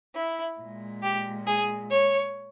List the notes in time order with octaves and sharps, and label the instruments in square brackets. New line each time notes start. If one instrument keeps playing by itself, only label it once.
[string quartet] E4
A#2 G#3
G4
G#4
C#5